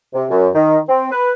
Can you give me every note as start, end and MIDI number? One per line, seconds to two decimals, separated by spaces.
0.14 0.25 48
0.30 0.48 42
0.55 0.78 51
0.89 1.10 60
1.12 1.34 71